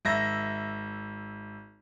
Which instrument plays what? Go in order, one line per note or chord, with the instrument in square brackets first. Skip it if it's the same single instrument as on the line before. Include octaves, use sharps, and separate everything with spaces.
[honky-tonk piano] G#1 E5 A#6